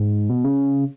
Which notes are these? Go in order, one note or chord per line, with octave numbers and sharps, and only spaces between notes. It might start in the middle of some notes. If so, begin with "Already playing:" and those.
Already playing: G#2
B2
C#3